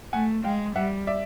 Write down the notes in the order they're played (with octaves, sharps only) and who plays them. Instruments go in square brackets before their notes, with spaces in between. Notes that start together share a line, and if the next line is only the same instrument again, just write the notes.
[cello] A3 [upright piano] F#5 G#5
[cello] G#3 [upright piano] F5 G5
[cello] G3 [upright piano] E5 F#5
[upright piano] D5 E5